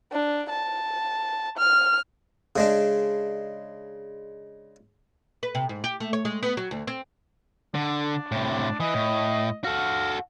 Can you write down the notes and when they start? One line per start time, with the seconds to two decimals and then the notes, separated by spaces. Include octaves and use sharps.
0.12 D4
0.50 A5
1.58 F6
2.56 C#3 G#3 D4
5.43 B4
5.55 C3
5.69 G#2
5.84 G4
6.00 A3
6.13 C#5
6.25 G#3
6.43 B3
6.57 F#3
6.71 D2
6.87 C4
7.75 D3 D4
8.32 A2 C3
8.80 E3 D#5
8.94 A2
9.64 F#4 A4 F5